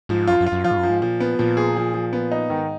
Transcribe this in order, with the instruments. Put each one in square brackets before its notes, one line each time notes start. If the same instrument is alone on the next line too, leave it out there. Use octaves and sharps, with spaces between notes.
[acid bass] G#2 [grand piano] F3
[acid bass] F#2 [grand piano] F4
[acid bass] F#2
[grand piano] F4
[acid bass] F#2
[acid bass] F3 [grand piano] F4
[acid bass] G#2
F#2
[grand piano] F3
[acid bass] G#2
[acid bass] A#2 [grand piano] F3
[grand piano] B3
[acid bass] A#2 [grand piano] F3
[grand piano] G#4
F3
F3
B3
D#4
[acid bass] G#2 [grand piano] D#3